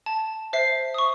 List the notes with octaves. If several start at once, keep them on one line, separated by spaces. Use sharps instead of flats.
A5
C5 E5 C7
C#6 D#6